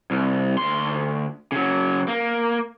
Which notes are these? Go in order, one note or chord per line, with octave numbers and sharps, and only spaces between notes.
C2
D2 C6
C#3 F#3
A#3